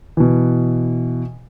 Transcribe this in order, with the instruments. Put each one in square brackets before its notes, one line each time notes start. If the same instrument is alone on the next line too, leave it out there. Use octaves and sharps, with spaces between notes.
[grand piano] B2 E3